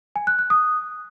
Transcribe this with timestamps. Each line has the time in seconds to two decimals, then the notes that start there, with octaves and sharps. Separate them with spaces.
0.16 G#5
0.27 F#6
0.39 F#6
0.50 D#6